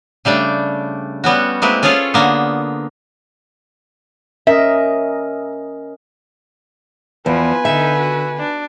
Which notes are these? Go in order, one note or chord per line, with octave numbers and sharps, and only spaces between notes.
C#3 G3 A3 D4 G5
G3 B3 C#4 F#4
G#3 A#3 C4 E4 B4
C#4 F4 G#4 A4 C#5 F5
D3 A#3 B3
C#4 A#4 D#5 E5
E2 F3 B4 G#5
D3 D#4 E5
F#4
D4